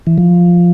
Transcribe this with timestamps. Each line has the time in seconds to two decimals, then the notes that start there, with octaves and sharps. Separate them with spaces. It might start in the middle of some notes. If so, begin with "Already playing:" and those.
0.07 E3
0.18 F3